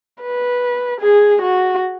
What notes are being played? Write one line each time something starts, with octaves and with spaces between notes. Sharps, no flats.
B4
G#4
F#4